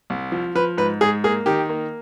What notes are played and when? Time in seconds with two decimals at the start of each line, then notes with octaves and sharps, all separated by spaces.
0.10 C2
0.32 F3
0.55 F3 B4
0.77 G#2 B4
1.01 G#2 G#4
1.24 A#3 G#4
1.46 D#3 G4
1.69 A#3